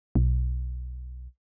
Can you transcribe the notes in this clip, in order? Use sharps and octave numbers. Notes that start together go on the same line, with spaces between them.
B1